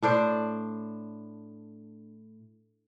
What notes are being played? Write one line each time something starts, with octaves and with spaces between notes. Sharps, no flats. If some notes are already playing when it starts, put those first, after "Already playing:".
A2 D4 C5 D5